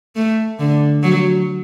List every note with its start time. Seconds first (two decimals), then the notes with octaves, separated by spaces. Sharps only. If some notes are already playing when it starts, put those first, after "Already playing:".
0.16 A3
0.59 D3
1.03 F#3